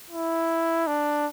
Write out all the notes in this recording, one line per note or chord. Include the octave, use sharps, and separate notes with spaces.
E4
D4